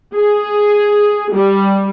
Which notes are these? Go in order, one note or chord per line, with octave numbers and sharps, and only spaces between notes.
G#4
G3